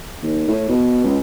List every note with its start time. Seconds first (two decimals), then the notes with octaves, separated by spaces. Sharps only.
0.23 D#2
0.48 A2
0.69 B2
1.04 C#2